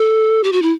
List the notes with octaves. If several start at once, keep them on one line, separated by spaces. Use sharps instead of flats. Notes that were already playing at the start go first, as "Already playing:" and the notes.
Already playing: A4
G4
F#4
E4